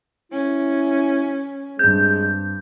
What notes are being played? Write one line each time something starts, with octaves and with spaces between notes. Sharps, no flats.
C#4 E4
G2 G#3 C4 G6